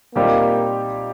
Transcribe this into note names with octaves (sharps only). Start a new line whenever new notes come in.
A#2 G3 A#3 C4 D#4 G4